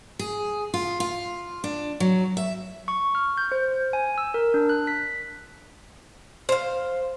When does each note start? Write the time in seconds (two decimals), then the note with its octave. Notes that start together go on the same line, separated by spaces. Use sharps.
0.19 G#4
0.74 F4
1.00 F4
1.64 D4
2.00 F#3
2.37 E5
2.88 C#6
3.15 F6
3.37 G6
3.52 C5
3.93 G#5
4.18 E6
4.34 A#4
4.54 D4
4.69 F#6
4.87 B6
6.49 C5 F5